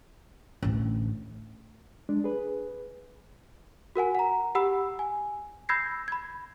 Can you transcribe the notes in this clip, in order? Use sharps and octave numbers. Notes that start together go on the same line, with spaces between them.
A1 D2
G#3 D4
G#4 B4
F#4 A#4 F#5 G#5
F#5 A#5
G4 F#5 B5 E6
G#5
B5 E6 G6 G#6 A#6 C7
B5 G#6